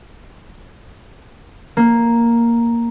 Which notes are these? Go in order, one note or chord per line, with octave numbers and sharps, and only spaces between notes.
A#3